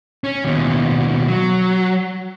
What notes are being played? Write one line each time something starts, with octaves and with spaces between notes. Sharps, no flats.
C#4
D#2 B2
F#3